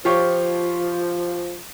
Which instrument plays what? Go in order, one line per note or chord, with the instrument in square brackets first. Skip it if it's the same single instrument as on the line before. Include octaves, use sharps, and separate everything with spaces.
[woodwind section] F3 [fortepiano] F4 G4 C#5